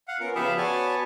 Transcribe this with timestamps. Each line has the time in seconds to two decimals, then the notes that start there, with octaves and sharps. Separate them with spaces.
0.08 F5 F#5
0.20 B3 C#4 F4 A#4
0.35 C#3 F3 B3 G4 E5 F5
0.57 F#4 C#5 D5 G#5 A5